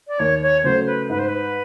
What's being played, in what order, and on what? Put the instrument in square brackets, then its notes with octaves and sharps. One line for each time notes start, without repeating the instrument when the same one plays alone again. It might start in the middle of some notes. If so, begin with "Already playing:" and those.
[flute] D5
[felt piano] D#2 [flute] C#5
[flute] C#5
[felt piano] C#3 F#3 A3 [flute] C5
[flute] B4
[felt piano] G#2 [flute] B4
[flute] C5
B4